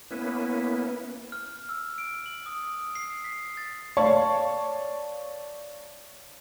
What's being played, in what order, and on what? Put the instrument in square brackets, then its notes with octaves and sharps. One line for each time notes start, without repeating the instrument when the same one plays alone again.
[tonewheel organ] A#3 B3 C#4 E4 B4
[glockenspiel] F6
E6
D7
F#7
D#6
C7
B6
A6
[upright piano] C#5 D5 F5 A5 C#6